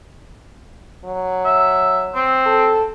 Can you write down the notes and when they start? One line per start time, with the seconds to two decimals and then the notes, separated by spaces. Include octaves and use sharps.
1.04 F#3
1.45 E5
2.15 C4
2.46 A4